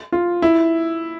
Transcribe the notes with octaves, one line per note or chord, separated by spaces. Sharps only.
F4
E4